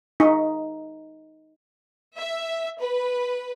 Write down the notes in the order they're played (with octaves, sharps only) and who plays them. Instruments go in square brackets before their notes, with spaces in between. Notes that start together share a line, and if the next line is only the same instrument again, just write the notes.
[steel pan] D#4
[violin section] E5
B4